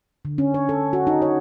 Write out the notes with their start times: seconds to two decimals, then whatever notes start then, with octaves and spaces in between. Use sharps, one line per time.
0.25 D3
0.38 C#4
0.54 C#5
0.69 A4
0.93 F#4
1.07 D#4
1.22 C#5